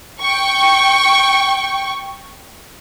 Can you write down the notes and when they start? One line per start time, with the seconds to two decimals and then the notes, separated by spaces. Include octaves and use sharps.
0.22 G5 C#6